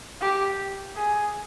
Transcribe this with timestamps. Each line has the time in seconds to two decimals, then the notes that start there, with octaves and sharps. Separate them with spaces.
0.22 G4
0.95 G#4